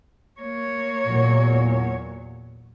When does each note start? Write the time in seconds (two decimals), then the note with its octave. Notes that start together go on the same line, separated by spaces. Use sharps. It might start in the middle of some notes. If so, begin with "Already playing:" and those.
0.41 A#3 C#5
1.07 E2 A#2 F#3